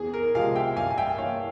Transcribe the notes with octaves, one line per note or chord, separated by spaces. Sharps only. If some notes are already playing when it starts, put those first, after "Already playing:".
Already playing: E2 G#4
A#4
C3 F3 G#3 F5 G#5
E5 G5
G2 F5 G#5
G#5
E5 G5
E3 A#3 C#5 F5